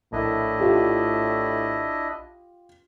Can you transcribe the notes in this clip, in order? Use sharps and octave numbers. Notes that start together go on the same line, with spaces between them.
A#1 A2 D4 E4 D#5
F4 G4